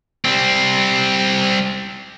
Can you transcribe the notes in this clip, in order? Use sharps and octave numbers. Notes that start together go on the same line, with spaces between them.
G3 C4